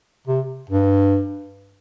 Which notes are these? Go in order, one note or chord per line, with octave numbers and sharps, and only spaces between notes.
C3
G2